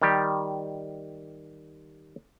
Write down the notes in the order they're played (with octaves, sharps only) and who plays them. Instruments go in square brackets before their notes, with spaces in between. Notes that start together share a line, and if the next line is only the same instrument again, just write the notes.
[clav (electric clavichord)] D#3 G3 G4